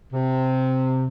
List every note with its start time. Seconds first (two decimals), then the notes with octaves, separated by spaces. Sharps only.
0.13 C3